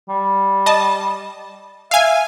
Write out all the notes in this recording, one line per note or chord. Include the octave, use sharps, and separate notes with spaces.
G3
D#5 A5
E5 F5 G#5